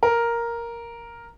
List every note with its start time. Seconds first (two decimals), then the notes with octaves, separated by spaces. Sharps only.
0.03 A#4